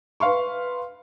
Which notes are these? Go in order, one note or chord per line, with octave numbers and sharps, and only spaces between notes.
B4 F5 C6 C#6